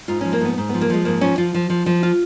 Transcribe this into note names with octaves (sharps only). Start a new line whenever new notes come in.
G#2 F4
F3 C#4
A#3
G#2 B3
G#2
F3 B3
A#3
F3 G#3
G#2 A#3
F3 C#4
F3 F4
F3
F3
F3
F4